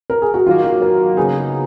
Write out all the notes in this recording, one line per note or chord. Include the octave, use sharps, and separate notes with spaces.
A#4
G#4
F#4
D#3 F#3 A#3 F4
F#4
A#4
C#3 F#3 B3 D#4 G#4